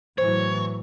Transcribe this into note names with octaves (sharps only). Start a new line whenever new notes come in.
A2 E3 F#3 C5 C#5